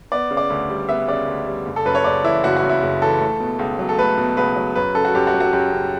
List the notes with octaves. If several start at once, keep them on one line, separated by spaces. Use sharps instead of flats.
B3 D5
C#3
D5
D2
G3
B3 E5
C#3 D5
D2
G3
F#1
A4
F#2 B4
C#5
F#1 D5
E3 E4
F#1 F#4
F#4
F#2
E4
F#1
E3 A4
A3
B2
C#2
F#3
A4
A3 B4
B2
C#2 B4
F#3
F#2 B4
C#3 A4
F#4
F#2 G4
F#4
F#3
F#4
F#2 G4
C#3